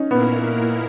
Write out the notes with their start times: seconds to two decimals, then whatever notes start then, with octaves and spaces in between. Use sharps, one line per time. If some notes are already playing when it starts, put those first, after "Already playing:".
Already playing: C#4 D#4
0.10 A#2 A#3 B3 E4 A#4